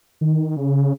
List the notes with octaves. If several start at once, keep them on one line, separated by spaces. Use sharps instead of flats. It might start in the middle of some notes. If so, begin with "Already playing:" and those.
D#3
C#3